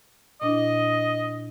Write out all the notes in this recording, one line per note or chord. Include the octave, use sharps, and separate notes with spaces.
A#2 D4 E4 D#5